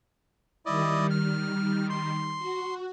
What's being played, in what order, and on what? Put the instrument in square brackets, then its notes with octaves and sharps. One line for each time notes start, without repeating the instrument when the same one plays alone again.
[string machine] D#3 G3 [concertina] E4 D5 D#5
[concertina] F6
C6
[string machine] F#4